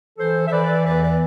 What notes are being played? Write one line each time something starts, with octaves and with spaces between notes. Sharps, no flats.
E3 A4 C5
E5
E3 B4 D5
E2 B4 D5
B4 D5